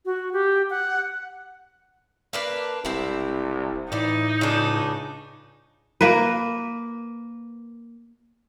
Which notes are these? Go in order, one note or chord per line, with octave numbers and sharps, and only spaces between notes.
F#4
G4
F#5
A#3 D4 B4
E1 C2 C4 E4
A2 E3 D#4 D5
C#2 C#3 D4
A#3 A#4 B4